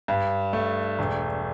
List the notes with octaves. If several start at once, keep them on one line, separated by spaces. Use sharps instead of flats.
G2
A3
E1